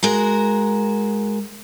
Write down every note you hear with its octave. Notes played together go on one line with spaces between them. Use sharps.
G#3 F#4 A#4